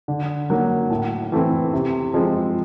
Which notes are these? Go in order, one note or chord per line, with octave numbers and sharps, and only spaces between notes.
D3
F#3 A#3
A2
E3 A3 C4
C3
F3 G#3 C4